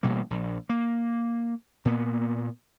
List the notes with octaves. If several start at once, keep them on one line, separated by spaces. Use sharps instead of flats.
A1 B2 G3 A#3
A#1
A#3
A#2 A#3 B3